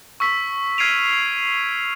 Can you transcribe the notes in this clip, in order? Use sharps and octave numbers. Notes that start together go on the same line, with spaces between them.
C#6 E6 B6
F6 G#6 C7 D7 D#7 F7